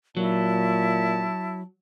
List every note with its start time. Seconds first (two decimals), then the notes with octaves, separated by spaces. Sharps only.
0.17 A#2 F#3 E4 A5